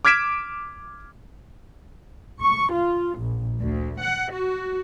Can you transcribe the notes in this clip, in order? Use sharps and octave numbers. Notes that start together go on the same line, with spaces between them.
D6 F6 G#6 B6 D7 E7
C#6
F4
A#1
D2
F#5
F#4